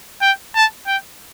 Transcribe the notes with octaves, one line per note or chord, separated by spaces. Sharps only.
G5
A5
G5